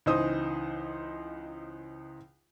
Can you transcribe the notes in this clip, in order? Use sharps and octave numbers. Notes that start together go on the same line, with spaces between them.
C#2 E3 D#4 C5 D#6